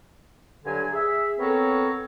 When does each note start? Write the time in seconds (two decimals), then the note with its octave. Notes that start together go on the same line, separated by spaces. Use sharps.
0.64 G2 D3 F#3 G#5
0.92 G#4 E5
1.39 B3 C4 A4 A#4 C#5